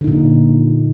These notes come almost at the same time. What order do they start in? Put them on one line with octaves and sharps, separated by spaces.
D3 D#4 A#2